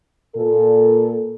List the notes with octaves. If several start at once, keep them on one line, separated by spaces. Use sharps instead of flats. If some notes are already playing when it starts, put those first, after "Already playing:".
A#2 A4